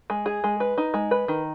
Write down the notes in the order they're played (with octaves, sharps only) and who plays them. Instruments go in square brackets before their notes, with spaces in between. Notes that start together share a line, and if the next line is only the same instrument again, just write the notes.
[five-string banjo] G#3
G#4
G#3
B4
D#4
G#3
B4
D#3